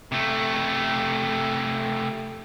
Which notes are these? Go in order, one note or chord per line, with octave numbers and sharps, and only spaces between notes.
C3 A3